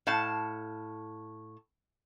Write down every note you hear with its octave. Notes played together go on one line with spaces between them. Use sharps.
A2 F5 A5